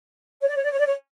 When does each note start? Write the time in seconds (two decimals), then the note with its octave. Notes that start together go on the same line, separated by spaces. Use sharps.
0.41 C#5
0.48 D5
0.56 C#5
0.64 D5
0.71 C#5
0.79 D5
0.87 C#5